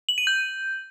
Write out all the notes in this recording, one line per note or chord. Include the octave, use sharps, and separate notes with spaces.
F#7
D#7
G6